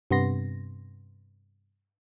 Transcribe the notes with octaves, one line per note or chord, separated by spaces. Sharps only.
G2 C3 B3 C6 A#6